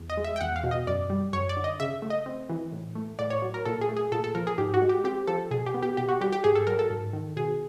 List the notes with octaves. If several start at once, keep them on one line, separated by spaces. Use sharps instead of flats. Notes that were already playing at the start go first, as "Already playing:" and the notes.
Already playing: E2
D#5
G#3
E5
G5
E2 F#5
F5
B2
D#5
F#2 D5
G3
F#2 C#5
D5
D3
D#5
C#3 E5
A3
D#5
C4
E3
A2
A3
A2 D5
C#5
F#3
A#4
A#2 A4
G#4
A3
G#4
A#2 A4
A4
F3 A#4
G#4
G#2 G4
F#4
G#3
G4
C4 G4
F3 A4
B2 G#4
G4
B3
G4
B2 G4
F#4
G3 G4
G4
G#2 G#4
A4
F#3 A#4
A4
G#2
D#3
B2 G#4